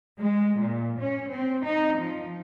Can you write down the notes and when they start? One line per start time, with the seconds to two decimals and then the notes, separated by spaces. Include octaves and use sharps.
0.18 G#3
0.58 A#2
0.99 C#4
1.29 C4
1.64 D#4
1.98 F3